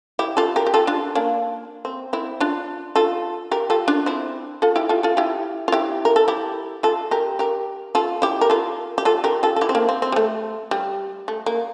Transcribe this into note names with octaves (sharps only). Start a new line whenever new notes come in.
E4 G4
F4 A4
G4 A#4
G4
F4 A4
D4 F4
A#3 D4
C4
C4 E4
D4 F4
F4 A4
G4 A#4
F4 A4
D4 F4
C4 E4
F4 A4
E4 G4
F4 A4
F4 A4
E4 G4
F4
E4 G4
A#4
A4
E4 G4
F4 A4
G4 A#4
G4 A#4
F4 A4
E4 G4
A#4
F4 A4
G4
F4 A4
G4 A#4
F4 A4
A4
E4 G4
C4
A#3 D4
C4
C4
G3
A3
G3
A3
A#3